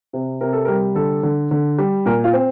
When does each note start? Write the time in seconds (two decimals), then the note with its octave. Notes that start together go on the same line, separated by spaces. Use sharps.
0.13 C3
0.41 C3 A#4
0.53 A4
0.65 G3 A#4
0.95 D3 A4
1.23 D3
1.51 D3
1.78 G3
2.06 A#2 A#4
2.24 F4 F5
2.33 C4